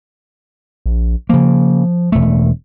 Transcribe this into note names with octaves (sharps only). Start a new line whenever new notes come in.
A#1
C#3 F3 A#3
E1 A3